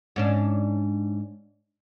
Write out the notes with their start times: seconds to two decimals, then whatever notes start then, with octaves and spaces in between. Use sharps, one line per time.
0.16 G#2 C#4 D4